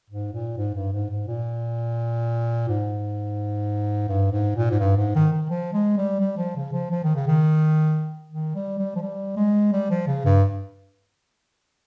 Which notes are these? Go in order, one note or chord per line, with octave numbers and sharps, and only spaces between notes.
G#2
A#2
G#2
G2
G#2
G#2
A#2
G#2
G2
G#2
A#2
G#2
G2
G#2
D#3
D#3
F3
G#3
G3
G3
F3
C#3
F3
F3
D#3
C#3
D#3
D#3
G3
G3
F3
G3
G#3
G3
F3
C#3
G2